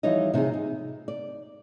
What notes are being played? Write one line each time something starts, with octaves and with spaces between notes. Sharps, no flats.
E3 F3 G3 D#4 C#5 D#5
C3 D#4 F4 G#4
D#4
D5